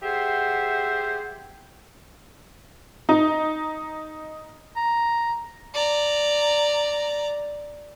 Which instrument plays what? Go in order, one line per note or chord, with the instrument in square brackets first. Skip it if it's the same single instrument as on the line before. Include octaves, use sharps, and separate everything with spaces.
[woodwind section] G4 G#4 C5 E5 F#5
[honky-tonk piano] D#4
[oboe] A#5
[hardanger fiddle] D5 A#5